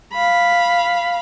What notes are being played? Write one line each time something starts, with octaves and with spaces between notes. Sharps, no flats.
F5 B5